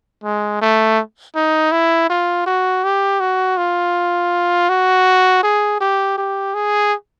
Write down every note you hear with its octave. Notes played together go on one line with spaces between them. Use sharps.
G#3
A3
D#4
E4
F4
F#4
G4
F#4
F4
F#4
G#4
G4
G4
G#4